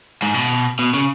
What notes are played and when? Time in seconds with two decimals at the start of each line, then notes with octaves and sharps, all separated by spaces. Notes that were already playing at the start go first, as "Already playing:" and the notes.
0.22 G#2
0.34 B2
0.79 B2
0.94 C#3